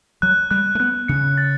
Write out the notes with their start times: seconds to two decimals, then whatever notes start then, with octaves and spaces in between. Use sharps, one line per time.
0.22 F#3 F#6
0.51 G3 F#6
0.75 A3
0.80 B3 F#6
1.08 C#3 C#7
1.38 A6